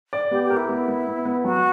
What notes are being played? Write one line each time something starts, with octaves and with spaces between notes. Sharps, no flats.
D5
B3 G4
G4
A#4
E4
B3
B3
B3
B3
F#3 F#4